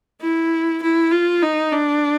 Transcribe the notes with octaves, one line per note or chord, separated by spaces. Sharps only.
E4
E4
F4
D#4
D4